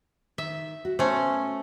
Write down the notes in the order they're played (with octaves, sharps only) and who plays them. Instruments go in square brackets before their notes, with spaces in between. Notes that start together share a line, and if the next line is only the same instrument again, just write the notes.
[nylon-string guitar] D#3 [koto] E5
[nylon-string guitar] F#4
[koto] A3 C#4 [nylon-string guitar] B3 C5